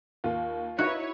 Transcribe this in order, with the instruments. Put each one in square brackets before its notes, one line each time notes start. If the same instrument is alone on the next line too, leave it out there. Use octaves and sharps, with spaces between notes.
[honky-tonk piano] D#2 [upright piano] F4
[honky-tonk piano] D#4 E5 [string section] E4 B4 C#5 [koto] F#4